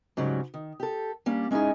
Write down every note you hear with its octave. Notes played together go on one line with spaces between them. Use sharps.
G#2 C#3 F#3 G3
D#3
G4 A4
G3 A#3 C#4 D4
G#3 C#4 D#4 E4 G#4